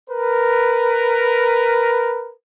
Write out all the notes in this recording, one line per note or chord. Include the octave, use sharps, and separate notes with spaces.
A#4 B4